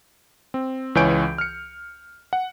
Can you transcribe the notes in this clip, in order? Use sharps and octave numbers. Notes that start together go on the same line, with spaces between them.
C4
C#2 E3 C#5 G#5 G6 D7
F6 C#7
F#5